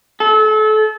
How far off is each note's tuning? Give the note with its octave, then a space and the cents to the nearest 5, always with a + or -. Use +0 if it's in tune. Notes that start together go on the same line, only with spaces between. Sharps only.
A4 -30